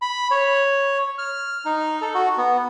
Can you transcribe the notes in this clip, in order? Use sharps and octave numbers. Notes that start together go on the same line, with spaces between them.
B5
C#5
F6
D#4
A4
F#4
B3